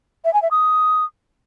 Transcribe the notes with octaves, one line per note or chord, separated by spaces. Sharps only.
E5
G#5
E5
D#6